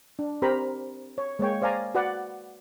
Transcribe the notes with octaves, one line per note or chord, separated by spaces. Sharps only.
D4
C4 G4 A#4 C5 A#5 B5
C#5
G#3 A#3 C#5 G5
C5 D5 F5 G#5 A#5
F#4 B4 D5 F#5